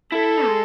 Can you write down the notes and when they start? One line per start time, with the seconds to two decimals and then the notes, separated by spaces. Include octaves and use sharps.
0.12 E4 A4
0.46 G#3